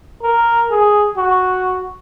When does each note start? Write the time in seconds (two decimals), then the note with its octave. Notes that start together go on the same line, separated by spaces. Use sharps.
0.23 A#4
0.70 G#4
1.17 F#4